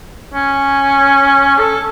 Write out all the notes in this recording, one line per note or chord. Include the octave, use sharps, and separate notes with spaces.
C#4
A4